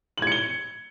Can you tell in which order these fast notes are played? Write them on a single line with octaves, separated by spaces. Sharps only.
F#7 G#6 C#7 G7